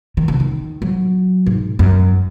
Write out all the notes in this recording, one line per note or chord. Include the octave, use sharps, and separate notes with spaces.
D#3
C#3
D#3
F#3
G#2
F#2